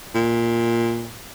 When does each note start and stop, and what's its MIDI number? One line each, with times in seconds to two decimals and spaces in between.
0.15 1.10 46